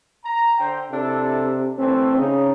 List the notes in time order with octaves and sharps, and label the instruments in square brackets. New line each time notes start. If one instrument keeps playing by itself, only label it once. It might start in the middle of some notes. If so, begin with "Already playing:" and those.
[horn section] A#5
D3 C5 G5
[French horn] C3 [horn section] D4 E4 A4
[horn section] D3 E3 A3 [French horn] C4
[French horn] C#3 [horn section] D#4